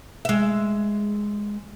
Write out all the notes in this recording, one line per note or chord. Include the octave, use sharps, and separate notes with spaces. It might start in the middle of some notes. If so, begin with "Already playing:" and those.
G#3 E5